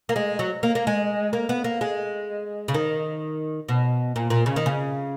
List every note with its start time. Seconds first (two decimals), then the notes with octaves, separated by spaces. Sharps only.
0.09 A#3
0.16 G#3
0.39 F#3
0.63 A#3
0.75 A#3
0.87 G#3
1.33 A#3
1.49 B3
1.64 A#3
1.81 G#3
2.68 C#3
2.74 D#3
3.69 B2
4.16 A#2
4.30 A#2
4.46 C#3
4.56 D#3
4.66 C#3